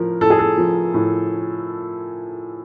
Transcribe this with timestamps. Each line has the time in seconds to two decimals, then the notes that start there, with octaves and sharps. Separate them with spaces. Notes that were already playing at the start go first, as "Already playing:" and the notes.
Already playing: A2 F3 A#4
0.21 A2 A4
0.30 G#4
0.39 A4
0.58 F3
0.94 A2